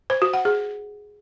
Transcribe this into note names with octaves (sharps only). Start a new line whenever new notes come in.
C5
F#4
F#5
G#4